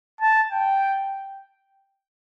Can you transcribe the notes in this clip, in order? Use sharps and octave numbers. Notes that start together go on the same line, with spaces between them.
A5
G5